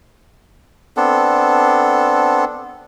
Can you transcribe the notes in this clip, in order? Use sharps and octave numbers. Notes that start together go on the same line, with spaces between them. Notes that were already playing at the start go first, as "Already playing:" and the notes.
B3 C4 D4 A4